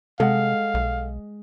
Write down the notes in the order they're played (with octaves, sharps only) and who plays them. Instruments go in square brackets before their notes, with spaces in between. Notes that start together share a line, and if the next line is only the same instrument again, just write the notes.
[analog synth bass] C3 [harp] G#3 [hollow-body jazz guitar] A4 F#5 [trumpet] F5
[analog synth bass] B1